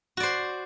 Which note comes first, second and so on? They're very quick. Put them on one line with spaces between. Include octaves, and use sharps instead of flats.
F#4 D5 C5